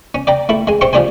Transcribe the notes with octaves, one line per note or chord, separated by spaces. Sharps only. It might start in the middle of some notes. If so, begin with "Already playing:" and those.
C#4
D5 G5 A#5
A3 E4
G#3 G#5
C3 C4 G4 C#6
F3 G3 D4 C5 G#5